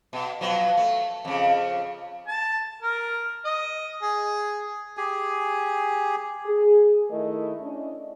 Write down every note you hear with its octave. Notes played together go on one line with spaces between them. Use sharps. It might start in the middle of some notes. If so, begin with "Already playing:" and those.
B2
B2 F3 F#3
A3
F2 C#3
A5
A#4
D#5
G#4
G4 G#4 G#5
G#4
D#3 A3 E4 A#4 D#5
C#4 D4 E4 D#5